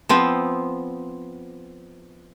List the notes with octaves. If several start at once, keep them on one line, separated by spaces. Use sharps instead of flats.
F3 B3 C4